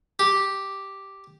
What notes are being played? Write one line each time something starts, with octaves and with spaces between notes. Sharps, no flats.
G4